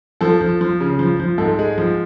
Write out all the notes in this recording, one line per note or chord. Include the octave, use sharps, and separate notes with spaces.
F3 A4
F3
F3
C#3
F3
F3
G#2 A4
G#3
F3